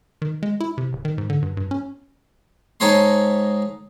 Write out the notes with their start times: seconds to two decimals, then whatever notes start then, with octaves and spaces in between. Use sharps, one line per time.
0.22 D#3
0.43 G#3
0.61 E4
0.78 C3
0.93 D1
1.05 D#3
1.18 G#2
1.30 D3
1.42 G2
1.57 G2
1.71 C#4
2.80 G#2 D#4 A4 C#5 D#5 C6